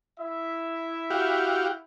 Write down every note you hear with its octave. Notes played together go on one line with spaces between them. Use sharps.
E4 E5
F#4 G4 F5